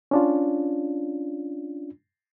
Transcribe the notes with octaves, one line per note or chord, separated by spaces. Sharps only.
C#4 D4 F4